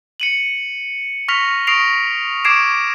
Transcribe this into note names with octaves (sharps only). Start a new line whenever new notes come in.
C#7 D#7 F#7
C#6 F6 A#6 B6 F7
C#6 D#6 A#6 C7 D7 F7
C#6 D6 G#6 C7 D7 E7